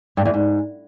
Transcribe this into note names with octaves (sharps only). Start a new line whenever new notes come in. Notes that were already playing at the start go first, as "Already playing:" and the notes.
G2
E2
G#2